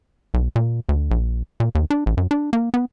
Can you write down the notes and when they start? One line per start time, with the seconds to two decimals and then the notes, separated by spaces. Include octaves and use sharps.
0.34 B1
0.56 A#2
0.89 D2
1.11 A#1
1.60 A#2
1.75 D#2
1.90 D4
2.06 A1
2.17 F#2
2.31 D4
2.53 A#3
2.74 B3